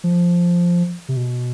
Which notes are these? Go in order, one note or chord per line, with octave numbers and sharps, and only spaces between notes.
F3
C3
B2